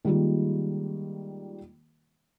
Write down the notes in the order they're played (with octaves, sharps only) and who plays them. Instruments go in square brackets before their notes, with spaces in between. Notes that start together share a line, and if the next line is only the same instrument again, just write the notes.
[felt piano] D#3 G3 G#3 A#3 F4